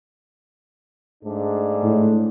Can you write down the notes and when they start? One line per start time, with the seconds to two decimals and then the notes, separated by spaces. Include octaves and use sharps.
1.24 G#2 A3 D4
1.83 A2